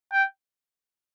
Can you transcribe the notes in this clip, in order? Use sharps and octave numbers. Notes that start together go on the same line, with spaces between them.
G5